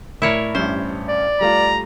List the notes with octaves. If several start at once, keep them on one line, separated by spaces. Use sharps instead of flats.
A2 E4 A#4 C#5 D5
A1 G2 C#4 C5
D5
G3 A3 F4 A#5